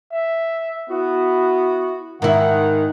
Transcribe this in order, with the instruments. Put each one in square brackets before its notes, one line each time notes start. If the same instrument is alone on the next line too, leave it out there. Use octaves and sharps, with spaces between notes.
[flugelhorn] E5
[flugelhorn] B3 [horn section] E4 F#4
[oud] G#2 E4 [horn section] D#3 [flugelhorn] F#5